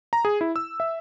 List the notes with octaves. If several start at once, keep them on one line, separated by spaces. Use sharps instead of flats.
A#5
G#4
E4
E6
E5